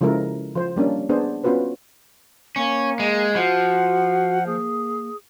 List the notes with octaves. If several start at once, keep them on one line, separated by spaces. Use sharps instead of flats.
C#3 F3 G#3 E4 A4 A#4
F3 C5
G3 A#3 C#4 D4
B3 D4 G#4 C5
B3 C#4 F4 F#4 B4 C5
A#3 C#4
G#3
F3 F#4 F#5
A#3 G#4